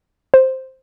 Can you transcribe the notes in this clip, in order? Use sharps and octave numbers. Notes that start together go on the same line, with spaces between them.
C5